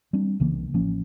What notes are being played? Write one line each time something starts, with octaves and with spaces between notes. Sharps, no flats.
G3 C4 D4
C2 C#3 E3 A#3
A1 F3 A#3 C#4